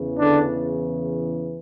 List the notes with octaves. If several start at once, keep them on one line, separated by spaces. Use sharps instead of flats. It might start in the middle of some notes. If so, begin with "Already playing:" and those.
Already playing: E2 C#3 E3
D3 D4